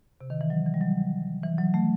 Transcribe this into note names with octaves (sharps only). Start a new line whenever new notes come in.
C3
D#3
E3
F#3
E3
G3
F#3
E3
F#3
A3